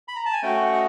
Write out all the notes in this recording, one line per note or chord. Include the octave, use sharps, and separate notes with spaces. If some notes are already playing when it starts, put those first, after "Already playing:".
B5
A#5
A5
G#5
A3 C#4 F#4 G5
F#5
D#5